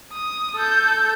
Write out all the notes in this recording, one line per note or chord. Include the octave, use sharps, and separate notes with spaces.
D#6
A4 G6